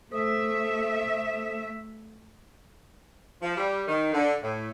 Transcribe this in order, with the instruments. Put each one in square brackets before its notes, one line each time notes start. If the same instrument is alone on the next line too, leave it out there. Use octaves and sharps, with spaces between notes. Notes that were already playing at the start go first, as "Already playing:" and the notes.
[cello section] A3 E5 [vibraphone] A4 C5 D#6
[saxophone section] F3
G3
D#3
D3
A2